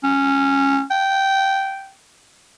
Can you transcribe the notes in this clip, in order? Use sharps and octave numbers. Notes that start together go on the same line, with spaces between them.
C#4
G5